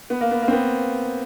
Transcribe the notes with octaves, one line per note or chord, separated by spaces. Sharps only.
B3
A#3
B3
A#3
C4
B3